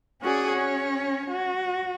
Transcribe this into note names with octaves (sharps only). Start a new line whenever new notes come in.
C#4 F#4 G#4 D5
C#4 C#5
F#4